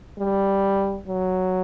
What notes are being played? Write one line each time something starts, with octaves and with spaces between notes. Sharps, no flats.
G3
F#3